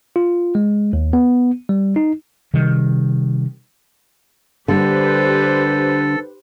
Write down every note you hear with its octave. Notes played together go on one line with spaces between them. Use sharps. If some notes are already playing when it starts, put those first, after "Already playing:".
F4
G#3
D#2
B3
G3
D#4
C3 D#3 G3
D3 G3 G4 A4 B4 C5